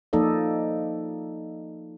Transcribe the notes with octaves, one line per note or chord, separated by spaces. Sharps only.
F3 A#3 D#4 A4 D5 D#5